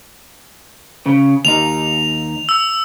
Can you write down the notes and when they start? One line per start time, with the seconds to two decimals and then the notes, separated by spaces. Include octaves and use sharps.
1.06 C#3
1.45 D#2 D#4 F7
2.49 E6